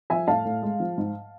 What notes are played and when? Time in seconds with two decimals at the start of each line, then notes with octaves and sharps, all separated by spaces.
0.10 F3 E5 G#5
0.27 A2 F5 A5
0.45 A2
0.63 G#3
0.80 F3
0.98 G#2